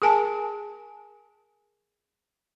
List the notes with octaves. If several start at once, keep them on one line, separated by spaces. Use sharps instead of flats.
G#4 A#4 G#5 A5